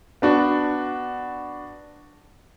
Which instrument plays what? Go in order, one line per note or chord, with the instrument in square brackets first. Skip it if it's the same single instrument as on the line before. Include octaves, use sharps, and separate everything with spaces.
[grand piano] B3 D4 F#4